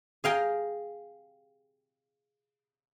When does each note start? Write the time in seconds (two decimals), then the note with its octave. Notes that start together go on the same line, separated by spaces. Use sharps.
0.24 G#4 F5 G5 A#5